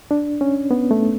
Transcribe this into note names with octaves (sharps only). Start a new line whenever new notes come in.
D4
C#4
B3
A3